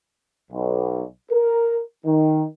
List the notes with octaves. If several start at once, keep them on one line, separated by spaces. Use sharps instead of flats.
B1
A#4
D#3